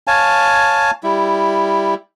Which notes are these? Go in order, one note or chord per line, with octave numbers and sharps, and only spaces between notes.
C#5 F5 G#5 A5
G3 E4